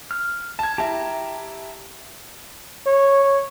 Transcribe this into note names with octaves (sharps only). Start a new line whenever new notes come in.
F6
A5 G#6
E4 G4 A5 A#5
C#5